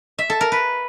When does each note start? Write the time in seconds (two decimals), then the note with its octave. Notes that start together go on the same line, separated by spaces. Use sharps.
0.18 E5
0.30 A4
0.41 A#4
0.52 B4